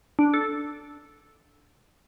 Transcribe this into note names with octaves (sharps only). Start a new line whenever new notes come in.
D4
A4